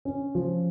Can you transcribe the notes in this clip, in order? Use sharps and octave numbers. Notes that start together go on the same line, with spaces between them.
C#4
F3